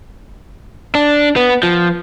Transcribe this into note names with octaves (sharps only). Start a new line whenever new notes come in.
D4
B3
F3